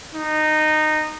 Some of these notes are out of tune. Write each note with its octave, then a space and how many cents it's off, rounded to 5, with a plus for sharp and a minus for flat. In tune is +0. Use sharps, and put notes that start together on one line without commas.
D#4 -15